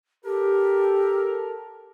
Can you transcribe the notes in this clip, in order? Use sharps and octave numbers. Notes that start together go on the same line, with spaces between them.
G4 A4 A#4